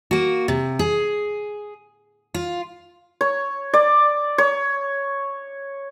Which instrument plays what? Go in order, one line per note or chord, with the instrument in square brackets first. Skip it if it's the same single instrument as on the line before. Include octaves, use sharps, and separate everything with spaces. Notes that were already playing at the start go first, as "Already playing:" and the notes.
[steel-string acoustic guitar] A#3 F#4
C3
G#4
F4
[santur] C#5
D5
C#5